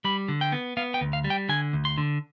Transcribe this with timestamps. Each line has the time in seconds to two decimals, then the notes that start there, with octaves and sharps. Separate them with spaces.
0.05 G3 B5
0.28 D3
0.41 G5
0.52 B3
0.77 B3 F5
0.94 G5
1.01 D2
1.13 F5
1.24 G3
1.30 G5
1.49 D3 G#5
1.73 D2
1.85 C6
1.98 D3